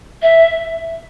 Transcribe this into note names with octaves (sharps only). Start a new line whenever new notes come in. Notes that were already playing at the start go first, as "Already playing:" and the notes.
E5